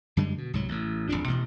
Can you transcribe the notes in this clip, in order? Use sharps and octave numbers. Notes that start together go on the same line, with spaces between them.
F#2 D3 G3 G#3
B2
C2 G#2 F#3
A1 A2
D1 G#1 F2 D4
A1 B2